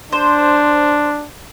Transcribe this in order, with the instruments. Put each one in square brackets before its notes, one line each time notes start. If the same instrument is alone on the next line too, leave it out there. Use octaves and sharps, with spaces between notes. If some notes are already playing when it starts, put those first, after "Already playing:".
[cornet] D4 [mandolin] C5